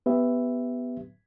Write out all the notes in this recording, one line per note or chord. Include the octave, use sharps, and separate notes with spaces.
B3 G4 B4 E5